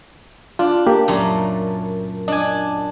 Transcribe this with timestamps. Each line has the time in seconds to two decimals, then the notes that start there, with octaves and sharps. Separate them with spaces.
0.59 D4 F4
0.86 A#3 G4
1.08 C#2 F#2 A#2 A3
2.28 D4 D#5 G#5